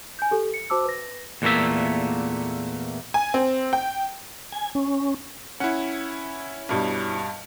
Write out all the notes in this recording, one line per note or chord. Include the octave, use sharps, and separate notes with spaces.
G#5 G6
G4 A4
C#7
F#4 C5 A5 D6 E6
B4 A#6
E2 A#2 E3 A3 A#3 E5
G#5
C4
G5
G#5
C#4
C#4 E4 F#5
G2 B2 G3